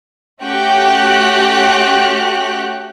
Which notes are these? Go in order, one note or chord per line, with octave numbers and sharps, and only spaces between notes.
A3 C#4 F#4 G4 G5 F#6